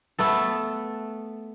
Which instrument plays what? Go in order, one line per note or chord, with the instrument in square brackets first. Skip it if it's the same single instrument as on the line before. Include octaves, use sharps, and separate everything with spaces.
[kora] A3 B3 A4